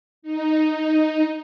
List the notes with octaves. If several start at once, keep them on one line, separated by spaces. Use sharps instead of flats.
D#4